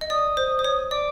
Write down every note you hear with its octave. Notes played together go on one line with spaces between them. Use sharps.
D#5
D5 D#6
C5
C5
C#5
D5 D6